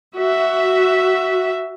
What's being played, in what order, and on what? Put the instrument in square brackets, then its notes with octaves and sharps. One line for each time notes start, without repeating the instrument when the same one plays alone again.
[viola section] F#4 E5